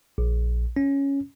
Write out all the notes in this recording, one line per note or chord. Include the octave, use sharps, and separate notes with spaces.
A#1
C#4